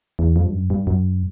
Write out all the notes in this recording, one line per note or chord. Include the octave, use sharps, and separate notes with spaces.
E2
F2
G2
F#2
G2
F#2